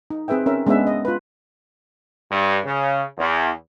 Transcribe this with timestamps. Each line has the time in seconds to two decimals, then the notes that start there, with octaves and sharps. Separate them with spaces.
0.10 D#4
0.28 C4 G#4 B4 E5 G5
0.46 C#4 A#4 E5
0.67 G#3 B3 C#4 D4 B4 E5
0.87 D#5
1.05 F4 B4
2.30 G2
2.65 C#3
3.18 E2